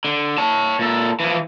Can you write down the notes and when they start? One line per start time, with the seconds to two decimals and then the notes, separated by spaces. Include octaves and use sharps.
0.05 D3
0.38 C#5 A5
0.79 A#2 A4
1.20 E3 F3